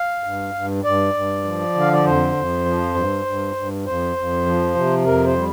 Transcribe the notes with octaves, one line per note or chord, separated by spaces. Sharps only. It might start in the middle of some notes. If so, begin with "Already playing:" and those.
Already playing: F5
G2
G2
G2 D5
G2
F3
D3
F5
D5
F2 C5
F2
F3
G2
G2
G2
F2 C5
F2
F3
C3
F2 A#4
C5
G3